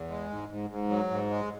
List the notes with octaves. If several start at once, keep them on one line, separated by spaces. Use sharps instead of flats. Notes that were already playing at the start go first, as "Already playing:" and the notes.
Already playing: E2
G#3
G#2
G#2
G#2
F#3
G#2
G#3